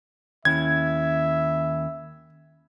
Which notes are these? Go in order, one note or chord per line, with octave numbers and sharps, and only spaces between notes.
D#2 C#4 E4 E5 G#6